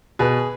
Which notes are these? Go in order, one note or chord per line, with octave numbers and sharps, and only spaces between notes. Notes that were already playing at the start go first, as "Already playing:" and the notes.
B2 G#4 B4